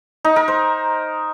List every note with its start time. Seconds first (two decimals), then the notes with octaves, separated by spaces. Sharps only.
0.24 D#4
0.36 A#4
0.48 C5